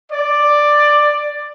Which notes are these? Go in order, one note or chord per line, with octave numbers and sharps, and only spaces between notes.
D5